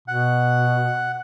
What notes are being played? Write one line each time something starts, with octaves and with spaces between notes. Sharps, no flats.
B2 F#5